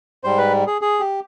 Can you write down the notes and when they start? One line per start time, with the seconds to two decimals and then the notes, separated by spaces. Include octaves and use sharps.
0.24 G#2 G3 C5
0.38 B4
0.67 G#4
0.81 G#4
1.00 G4